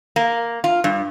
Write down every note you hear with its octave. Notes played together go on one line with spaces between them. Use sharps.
A#3
F4
G2